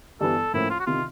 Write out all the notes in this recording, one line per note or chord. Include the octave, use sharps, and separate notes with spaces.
G2 E3 G3 B3 A4
A2 F3 A#3 C#4 E4
F4
F#4
C3 D#3 F4